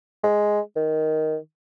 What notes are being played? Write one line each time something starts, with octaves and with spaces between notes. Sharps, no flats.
G#3
D#3